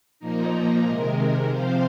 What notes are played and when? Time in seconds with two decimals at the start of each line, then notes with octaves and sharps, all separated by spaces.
0.19 A#2 F3 A#3 D#4 A#4
0.51 A#4
0.84 C3 D#3 G#3
1.48 C3 F3 C4 C5 F5